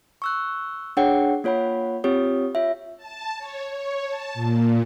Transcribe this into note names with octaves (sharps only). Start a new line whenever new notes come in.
C#6 E6 F#6
D4 G#4 C#5 F#5 G5
A#3 F4 C#5 F#5 B5
C4 F4 G4 C#5 D#6
F4 C#5 E5
A5
C#5
C#5
A5
A#2